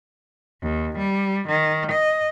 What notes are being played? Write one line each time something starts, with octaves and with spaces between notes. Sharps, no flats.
D#2
G3
D#3
D#5